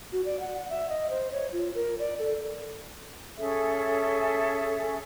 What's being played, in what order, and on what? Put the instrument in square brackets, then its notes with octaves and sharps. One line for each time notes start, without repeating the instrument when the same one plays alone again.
[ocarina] F#4
D5
F#5
F#5
E5
D#5
C5
C#5
F4
A#4
D5
A4
[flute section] C#4 G#4 A4 E5